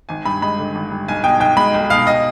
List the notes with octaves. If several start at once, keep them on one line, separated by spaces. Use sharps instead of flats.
G#1 G#5
G2 B5
G#3 B5
D3
G#1
G2
B1 G#5
B2 G5
B1 G5
G#3 B5
B1
B2 F5
D#5